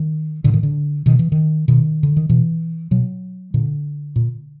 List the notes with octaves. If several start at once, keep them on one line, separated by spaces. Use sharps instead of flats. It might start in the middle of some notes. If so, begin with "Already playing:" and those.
Already playing: D#3
A2 D3
D#3
D3
B2 D#3
E3
D#3
B2 D#3
D3
D#3
B2 E3
B2 F#3
A#2 D3
A#2